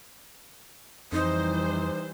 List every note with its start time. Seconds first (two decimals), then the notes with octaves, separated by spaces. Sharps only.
1.12 F2 E3 G3 D#4 C5